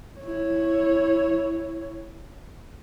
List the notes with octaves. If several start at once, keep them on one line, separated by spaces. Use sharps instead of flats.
E4 C#5